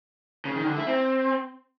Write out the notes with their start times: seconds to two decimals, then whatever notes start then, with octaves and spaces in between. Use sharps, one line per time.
0.45 C#3
0.56 D#3
0.66 D3
0.76 E4
0.87 C4